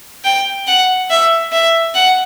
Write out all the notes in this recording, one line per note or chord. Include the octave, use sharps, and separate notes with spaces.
G5
F#5
E5
E5
F#5